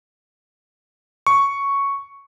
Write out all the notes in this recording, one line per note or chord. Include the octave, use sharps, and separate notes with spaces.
C#6